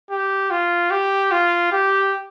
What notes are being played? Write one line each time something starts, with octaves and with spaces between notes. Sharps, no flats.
G4
F4
G4
F4
G4